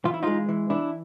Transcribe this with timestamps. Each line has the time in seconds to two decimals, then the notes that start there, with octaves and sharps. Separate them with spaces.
0.05 E3 F4
0.14 E4
0.23 G#3 D#4 F4
0.49 E3
0.70 E3 D4 E4